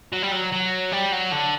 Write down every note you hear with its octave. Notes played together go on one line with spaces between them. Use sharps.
F#3
G3
F#3
F#3
G3
F#3
D3